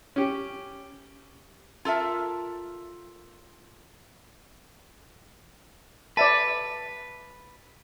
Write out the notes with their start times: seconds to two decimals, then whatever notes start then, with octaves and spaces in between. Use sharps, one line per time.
0.16 C#4 G4
1.85 F4 A4 A#4 E5
6.17 B4 D5 E5 A5